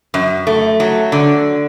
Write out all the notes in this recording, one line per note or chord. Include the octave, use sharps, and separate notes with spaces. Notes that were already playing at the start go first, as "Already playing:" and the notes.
F#2
A3
F#3
D3